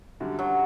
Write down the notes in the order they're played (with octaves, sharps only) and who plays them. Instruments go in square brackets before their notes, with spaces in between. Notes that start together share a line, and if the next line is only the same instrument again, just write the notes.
[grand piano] F#2 D3 G3
[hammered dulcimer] F#3